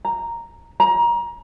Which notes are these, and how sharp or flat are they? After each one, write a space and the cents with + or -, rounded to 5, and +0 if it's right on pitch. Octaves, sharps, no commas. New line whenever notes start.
A#5 -5
A#5 +25